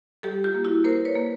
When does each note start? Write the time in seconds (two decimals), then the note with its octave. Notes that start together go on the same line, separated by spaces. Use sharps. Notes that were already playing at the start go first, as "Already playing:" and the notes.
0.23 G3 G4 A4
0.44 F4 G4
0.54 A#3
0.64 E4 F#4
0.84 A#3 A#4 C5
1.05 B4 C#5
1.15 A#3